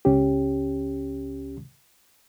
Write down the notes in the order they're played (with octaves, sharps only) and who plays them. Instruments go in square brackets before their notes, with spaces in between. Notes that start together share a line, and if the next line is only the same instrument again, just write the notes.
[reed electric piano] C#2 C#4 G4